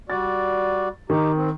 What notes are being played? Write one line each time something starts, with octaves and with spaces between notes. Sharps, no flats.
G3 F#4 D5 A6
D#3 D#4 G4
C4